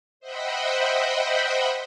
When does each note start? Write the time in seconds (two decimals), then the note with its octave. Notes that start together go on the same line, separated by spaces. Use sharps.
0.20 C5 D#5 E5 F#5 G5 B5